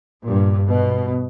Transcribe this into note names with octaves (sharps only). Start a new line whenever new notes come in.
G2 A#2
B2